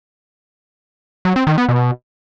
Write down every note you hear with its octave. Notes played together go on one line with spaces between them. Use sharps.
F#3
C4
D#3
B3
B2